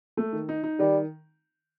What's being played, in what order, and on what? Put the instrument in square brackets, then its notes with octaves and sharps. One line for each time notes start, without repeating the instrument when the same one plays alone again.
[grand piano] A3
D#3
D#4
D#4
[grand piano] D#3 [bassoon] G3